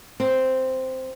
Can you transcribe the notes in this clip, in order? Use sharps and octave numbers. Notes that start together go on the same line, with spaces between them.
C4